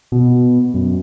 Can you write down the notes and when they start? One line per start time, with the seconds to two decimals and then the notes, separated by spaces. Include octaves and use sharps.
0.12 B2
0.74 F#2